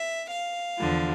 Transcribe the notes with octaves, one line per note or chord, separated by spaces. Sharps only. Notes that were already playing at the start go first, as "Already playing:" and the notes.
Already playing: E5
F5
E2 D3 F3